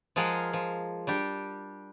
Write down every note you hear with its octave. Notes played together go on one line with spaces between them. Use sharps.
F3 G#3 F4 G#4 A#4 F#5
F3
G3 D4 G4